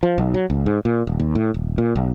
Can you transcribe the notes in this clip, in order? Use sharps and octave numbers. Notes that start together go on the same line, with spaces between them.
F3
B1
F#3
C#2
G#2
A#2
D#1
D#2
A2
D#1
A#2
B1